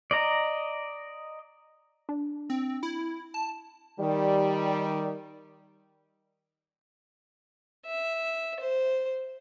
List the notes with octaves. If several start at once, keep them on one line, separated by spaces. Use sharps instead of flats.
D5 D#5 A#5
D4
C4
E4
A5
D#3 G3
E5
C5